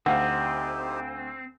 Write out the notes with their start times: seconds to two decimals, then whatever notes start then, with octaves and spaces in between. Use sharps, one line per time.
0.06 D2 C4 D#4 G4 F5 F#5